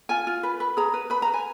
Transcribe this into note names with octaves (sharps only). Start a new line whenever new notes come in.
F4 G#5
F4
B4
B4
G#4 A#5
B4
B4 B5
A#5
B4
G#5